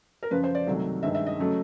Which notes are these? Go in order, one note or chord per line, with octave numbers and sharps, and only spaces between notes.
A#4
F#2 C#3 F3 B4
C5
D5
C2 C3 D#3 F#3 A3
G2 D#3 G#3 E5
E5
D#5
C#3 F#3 A3